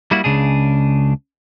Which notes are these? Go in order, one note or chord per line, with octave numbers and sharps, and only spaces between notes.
G3 A#3 E4 F#4
C#2 C#3 D4 G#4